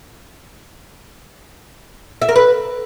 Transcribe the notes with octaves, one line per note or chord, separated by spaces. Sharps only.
E5
A#4
B4